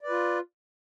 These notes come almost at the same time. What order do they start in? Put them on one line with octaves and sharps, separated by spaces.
D5 B4 F4